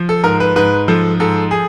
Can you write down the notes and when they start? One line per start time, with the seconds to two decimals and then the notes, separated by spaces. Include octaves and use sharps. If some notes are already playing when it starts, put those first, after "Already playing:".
Already playing: F3
0.09 A4
0.24 G#2 A#4
0.40 B4
0.56 G#2 B4
0.88 F3 A4
1.20 G#2 A4
1.51 G#4